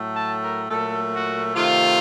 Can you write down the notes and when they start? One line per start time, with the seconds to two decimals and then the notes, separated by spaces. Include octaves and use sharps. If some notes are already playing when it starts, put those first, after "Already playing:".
Already playing: A2 F#3 A3
0.14 A5
0.43 A#4
0.70 A#2 F#3 A3 A4
1.14 F#4
1.55 C3 D#3 A3 F4